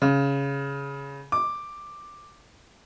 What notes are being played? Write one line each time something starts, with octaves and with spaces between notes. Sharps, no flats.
C#3
D6